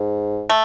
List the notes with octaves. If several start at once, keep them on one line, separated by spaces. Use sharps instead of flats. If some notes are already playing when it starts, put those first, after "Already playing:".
Already playing: G#2
A3